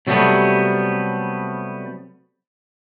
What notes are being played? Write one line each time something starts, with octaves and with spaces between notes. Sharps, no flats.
C3 F#3 G3 A3 B3